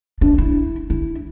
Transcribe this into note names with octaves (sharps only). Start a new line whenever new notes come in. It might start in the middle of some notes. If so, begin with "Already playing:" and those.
D4
E4
E4